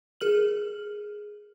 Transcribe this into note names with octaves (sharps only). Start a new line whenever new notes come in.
G#4 A#4 F6 F#7